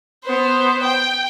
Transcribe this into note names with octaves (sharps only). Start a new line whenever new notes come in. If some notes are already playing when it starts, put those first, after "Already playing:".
B3 C5
G5